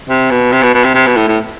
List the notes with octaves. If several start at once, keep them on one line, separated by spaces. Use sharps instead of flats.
C3
B2
C3
B2
B2
C3
C3
B2
A2
A2